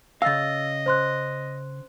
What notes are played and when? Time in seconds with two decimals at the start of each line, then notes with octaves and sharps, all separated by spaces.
0.22 C#3 D#5 F5 E6 A6
0.86 C5 C6 F#6